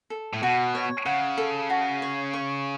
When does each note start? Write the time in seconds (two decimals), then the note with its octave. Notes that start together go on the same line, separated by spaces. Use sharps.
0.10 A4
0.33 A2
0.43 B2 F#4
0.75 C#5
1.06 C#3 F#5
1.38 A4
1.70 F#4
2.02 C#5
2.33 C#6